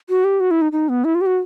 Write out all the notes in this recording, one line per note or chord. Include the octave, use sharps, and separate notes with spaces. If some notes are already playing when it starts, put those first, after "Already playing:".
F#4
G4
F#4
E4
D#4
D#4
B3
E4
F4
G4
F#4